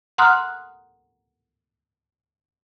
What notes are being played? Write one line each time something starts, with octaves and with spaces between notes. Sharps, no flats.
F#5 A#5 C6 D#6 F6 F#6